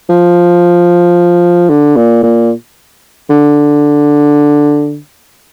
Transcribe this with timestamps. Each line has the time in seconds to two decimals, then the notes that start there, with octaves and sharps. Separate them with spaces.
0.09 F3
1.69 D3
1.96 A#2
2.23 A#2
3.30 D3